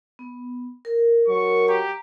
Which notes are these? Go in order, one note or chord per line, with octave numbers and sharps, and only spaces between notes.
B3
A#4
F#3 C#6
G4 A#5